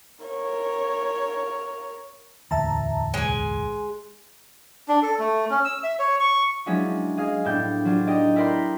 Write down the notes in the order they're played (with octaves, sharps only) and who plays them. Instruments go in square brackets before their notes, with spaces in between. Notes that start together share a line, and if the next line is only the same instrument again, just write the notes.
[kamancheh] A#4 C#5
[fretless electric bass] E1 A1 D2 [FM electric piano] E5 A5 A#5
[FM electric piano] B1 [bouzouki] G#3 G#5
[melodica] D4
A4
A3
C#4
E6
E5
C#5
C#6
[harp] F3 F#3 G#3 C#4 D4 E4
G#4 D#5 F5
A2 B3 D4 G4 G6
F#3 C4 D4 F4
D#4 G4 D5 D#5 G5
E4 A#4 D5 G5 B5 C6